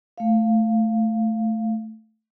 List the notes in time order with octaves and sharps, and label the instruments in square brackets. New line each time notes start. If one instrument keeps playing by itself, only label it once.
[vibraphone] A3 F5